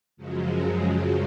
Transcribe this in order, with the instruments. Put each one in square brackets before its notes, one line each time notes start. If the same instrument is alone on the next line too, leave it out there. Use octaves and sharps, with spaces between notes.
[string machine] F#2 C#3 F3 F#3 G#3